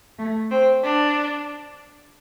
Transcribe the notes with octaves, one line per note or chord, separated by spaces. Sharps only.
A3
C4
D4